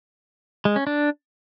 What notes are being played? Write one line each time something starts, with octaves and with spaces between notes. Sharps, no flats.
G#3
C#4
D4